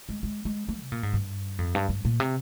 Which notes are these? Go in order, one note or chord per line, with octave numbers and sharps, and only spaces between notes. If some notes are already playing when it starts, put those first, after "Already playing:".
G#3
G#3
G#3
A#3
C3
A#2
G#2
G2
F2
G2
G2
A#2
C3